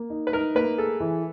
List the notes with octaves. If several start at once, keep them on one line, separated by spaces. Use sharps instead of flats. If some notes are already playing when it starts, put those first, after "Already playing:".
Already playing: A#3
D#4
B4
D#4 A#4
A#3 B4
G#4 A4
E3